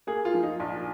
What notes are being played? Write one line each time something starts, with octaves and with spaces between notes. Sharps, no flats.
A#3 G#4
F4
F3
D#4
A#1